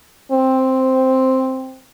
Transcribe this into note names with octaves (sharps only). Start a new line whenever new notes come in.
C4